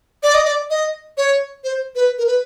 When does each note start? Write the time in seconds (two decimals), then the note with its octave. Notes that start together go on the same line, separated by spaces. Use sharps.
0.23 D5
0.34 D#5
0.45 D5
0.70 D#5
1.17 C#5
1.64 C5
1.95 B4
2.18 A#4
2.27 B4